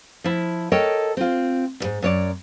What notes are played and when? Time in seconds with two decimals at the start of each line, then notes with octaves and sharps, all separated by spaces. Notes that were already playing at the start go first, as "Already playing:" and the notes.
0.24 F3 E4
0.72 A4 A#4 C#5 D#5 G5
1.17 C4 F4
1.80 D2 G#2
2.02 F#2 C#5 D5